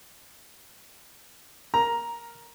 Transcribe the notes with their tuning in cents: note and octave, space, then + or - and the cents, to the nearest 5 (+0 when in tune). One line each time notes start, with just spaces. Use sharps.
A#4 +0 A#5 +10